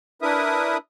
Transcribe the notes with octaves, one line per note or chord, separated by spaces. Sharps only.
D4 E4 A#4 B4 E5 D#6